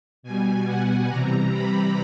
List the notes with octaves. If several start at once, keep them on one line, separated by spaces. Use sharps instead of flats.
B2 G3 G#5
F#5
C3 E3 G3 A#5
B5